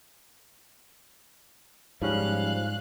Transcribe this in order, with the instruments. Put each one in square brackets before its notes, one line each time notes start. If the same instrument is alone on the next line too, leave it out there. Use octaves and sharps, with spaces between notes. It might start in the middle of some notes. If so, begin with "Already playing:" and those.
[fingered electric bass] G#2 [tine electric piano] F3 G3 C#4 [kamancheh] F5 F#6